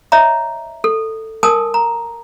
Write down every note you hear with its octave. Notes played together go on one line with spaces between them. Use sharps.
C#5 D#5 E5 A#5
A4
A#4 G#5 A5 D#6
A#5